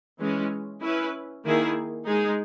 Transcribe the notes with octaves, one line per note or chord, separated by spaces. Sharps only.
E3 G#3 C#4
C#4 E4 B4
D#3 A#3 E4 G#4
G#3 D#4 G#4